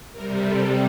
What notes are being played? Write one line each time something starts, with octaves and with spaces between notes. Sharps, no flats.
C3 G3 A#4
A4